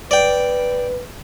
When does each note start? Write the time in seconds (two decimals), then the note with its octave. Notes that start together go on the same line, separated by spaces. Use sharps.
0.11 B4 D5 G5